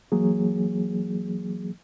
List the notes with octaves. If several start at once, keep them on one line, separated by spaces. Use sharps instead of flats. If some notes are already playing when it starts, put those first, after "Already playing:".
E3 F#3 A#3 G#4